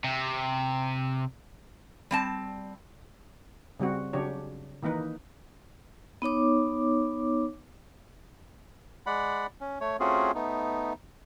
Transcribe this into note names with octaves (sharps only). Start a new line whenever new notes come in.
C3
G3 C4 A5
C#3 G3 C4 F#4
C#3 F#3 D4 G4 C#5
D#3 E3 A#3 D#4 B4
B3 D#4 C#5 D6
G#3 D5 F#5 B5
C#4
A3 C#5
A3 C4 C#4 F4 F#4 G#4
A3 B3 D#4